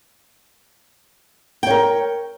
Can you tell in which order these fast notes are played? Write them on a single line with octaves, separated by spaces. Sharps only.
G5 C#5 A#4